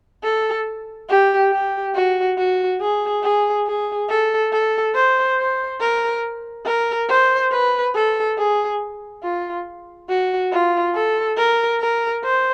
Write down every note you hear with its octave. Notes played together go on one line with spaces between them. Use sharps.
A4
G4
G4
F#4
F#4
G#4
G#4
G#4
A4
A4
C5
C5
A#4
A#4
C5
B4
A4
G#4
F4
F#4
F4
A4
A#4
A#4
C5